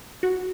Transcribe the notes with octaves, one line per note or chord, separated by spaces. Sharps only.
F#4